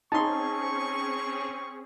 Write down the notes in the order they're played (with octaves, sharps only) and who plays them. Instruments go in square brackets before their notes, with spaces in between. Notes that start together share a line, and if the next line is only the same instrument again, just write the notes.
[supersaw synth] C4 C#4 G#4 [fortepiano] D#4 C6 [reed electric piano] A5 [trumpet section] C#6